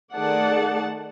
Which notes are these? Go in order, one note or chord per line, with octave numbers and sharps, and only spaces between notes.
D#3 A3 G#4 D5 F#5 A5